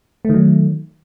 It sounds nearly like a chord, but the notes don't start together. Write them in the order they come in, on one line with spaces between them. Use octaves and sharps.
A3 D#3 F#3